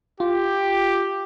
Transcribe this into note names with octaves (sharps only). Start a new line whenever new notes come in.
F4 G4